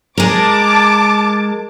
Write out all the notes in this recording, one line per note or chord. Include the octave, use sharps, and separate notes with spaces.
G#3 A#4 A5 D6